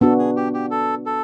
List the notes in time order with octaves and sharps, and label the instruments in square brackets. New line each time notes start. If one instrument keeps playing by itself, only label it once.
[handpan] B3 D4 F#4 [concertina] A4
[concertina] G#4
G4
G4
A4
A4